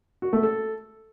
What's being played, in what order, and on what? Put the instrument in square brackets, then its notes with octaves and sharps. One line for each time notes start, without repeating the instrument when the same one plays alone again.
[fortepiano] F#4
A3
A4